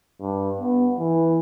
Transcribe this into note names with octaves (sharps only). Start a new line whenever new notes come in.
G2
B3
E3